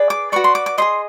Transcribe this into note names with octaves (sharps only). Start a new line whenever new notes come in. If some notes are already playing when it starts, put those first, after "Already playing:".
Already playing: G#4 B4 D5
D6
F#4 B4 D5 C#6
C6
D6
D6
G#4 C5 D#5 C6